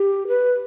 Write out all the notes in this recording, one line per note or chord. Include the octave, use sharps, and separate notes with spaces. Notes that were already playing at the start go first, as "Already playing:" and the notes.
Already playing: G4
B4